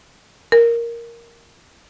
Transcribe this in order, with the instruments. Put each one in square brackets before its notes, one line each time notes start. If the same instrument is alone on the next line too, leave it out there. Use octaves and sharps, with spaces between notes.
[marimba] A#4